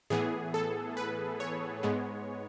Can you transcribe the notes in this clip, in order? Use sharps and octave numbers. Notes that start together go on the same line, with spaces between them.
A2 E3 B3 G#4
A4
B4
C#5
G#2 G#3 B3